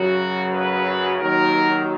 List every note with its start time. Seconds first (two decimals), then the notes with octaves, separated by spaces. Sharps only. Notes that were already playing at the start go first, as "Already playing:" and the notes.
Already playing: F#2 C#3 F#3 F#4
0.53 B4
1.20 D#2 D#3 F#3 A#4